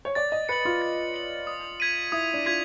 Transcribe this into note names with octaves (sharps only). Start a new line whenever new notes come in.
C#5
D5 A6
D#5
B4 C#7 F#7
F4
A6
C#7 F#7
D#6
G#6 B6 D#7
E4 D#6
D4
F4 G#6 B6 D#7